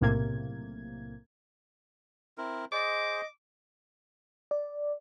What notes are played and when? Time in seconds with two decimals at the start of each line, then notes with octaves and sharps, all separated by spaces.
0.01 B1 A2 C3 A#3 G#6
2.38 C4 E4 A#4
2.72 G#4 C5 D#5 D6
4.51 D5